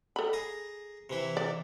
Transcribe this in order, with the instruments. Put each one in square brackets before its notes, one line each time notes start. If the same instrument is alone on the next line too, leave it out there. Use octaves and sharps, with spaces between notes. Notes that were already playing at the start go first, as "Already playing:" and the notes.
[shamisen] A4 B5
[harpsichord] G#4 A#5
C3 E3 E4
[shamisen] D5